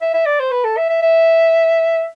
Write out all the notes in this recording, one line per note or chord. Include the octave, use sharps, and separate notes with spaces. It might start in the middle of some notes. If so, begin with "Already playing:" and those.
E5
E5
D5
C5
B4
A4
E5
E5
E5